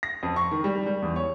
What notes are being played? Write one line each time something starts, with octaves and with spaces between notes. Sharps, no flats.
A#6
F2
C#6
D#3
G3
G3
E2
C#5